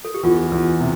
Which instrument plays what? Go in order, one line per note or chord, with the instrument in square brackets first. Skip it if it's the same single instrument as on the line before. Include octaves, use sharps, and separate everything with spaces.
[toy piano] A4
G4
[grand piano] E2 [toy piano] F4
[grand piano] E2
C3